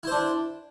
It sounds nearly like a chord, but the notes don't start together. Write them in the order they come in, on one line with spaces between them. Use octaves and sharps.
E4 C5 D4